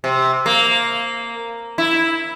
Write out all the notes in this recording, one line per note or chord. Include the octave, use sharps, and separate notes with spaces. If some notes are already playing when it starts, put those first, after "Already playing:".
C3
A#3
E4